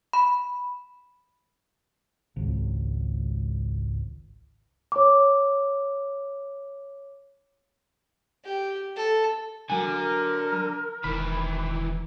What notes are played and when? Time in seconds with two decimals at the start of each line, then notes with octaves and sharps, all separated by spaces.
0.13 B5
2.36 G#1 C#2
4.92 C#5 D6
8.44 G4
8.96 A4
9.70 D3 F#3 A#4 G#5
11.04 E1 D#3 E3 B5